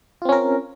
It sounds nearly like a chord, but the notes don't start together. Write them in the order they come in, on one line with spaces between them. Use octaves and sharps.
F4 C4 C#4 A#4